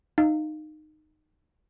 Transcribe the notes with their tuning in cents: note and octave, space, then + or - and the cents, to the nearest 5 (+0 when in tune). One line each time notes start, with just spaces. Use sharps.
D#4 -15 F5 -10